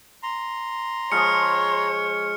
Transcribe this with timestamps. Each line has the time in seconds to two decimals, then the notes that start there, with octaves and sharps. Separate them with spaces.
0.23 A#5 C6
1.12 F3 G#3 C#5 F6 C#7